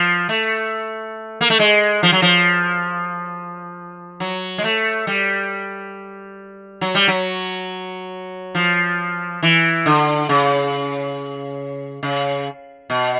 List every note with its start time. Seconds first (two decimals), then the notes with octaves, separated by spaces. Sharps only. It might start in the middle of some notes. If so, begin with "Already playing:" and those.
Already playing: F3
0.29 A3
1.41 A#3
1.50 A3
1.59 G#3
2.03 F3
2.12 F#3
2.22 F3
4.20 F#3
4.58 G#3
4.64 A3
5.07 G3
6.81 F#3
6.95 G3
7.08 F#3
8.55 F3
9.43 E3
9.86 D3
10.29 C#3
12.03 C#3
12.90 B2